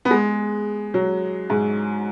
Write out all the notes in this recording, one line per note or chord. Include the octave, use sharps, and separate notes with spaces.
B3
G#3
F#3
G#2